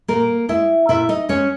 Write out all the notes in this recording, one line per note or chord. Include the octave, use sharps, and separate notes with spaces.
A#2 A#3 A#4
G#3 E4 E5
A#2 E4 E5
D#4 D#5
G#3 C#4 C#5